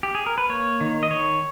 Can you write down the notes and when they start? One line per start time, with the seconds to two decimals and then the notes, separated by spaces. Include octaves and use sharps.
0.03 G4
0.15 G#4
0.26 A#4
0.38 B4
0.49 A#3 C#5
0.81 D#3
1.03 D#5
1.11 D#3 C#5